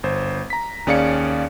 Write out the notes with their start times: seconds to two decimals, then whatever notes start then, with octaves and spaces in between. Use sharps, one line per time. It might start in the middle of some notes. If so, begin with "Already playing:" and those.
0.03 G1 C5
0.50 A#5 B6
0.87 D#2 C#4 G#4 D5 F5 C#7